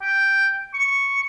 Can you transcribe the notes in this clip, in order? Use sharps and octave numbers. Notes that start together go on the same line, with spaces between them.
G5
C#6